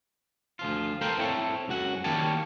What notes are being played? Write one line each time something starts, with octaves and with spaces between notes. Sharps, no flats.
D2 F3 F4
A4 A#4 C5 F5 G5
C4 E4 A4 C#5
C#2 F#2 F#4 F#5
D#3 G3 A#3 C#5 G5 A5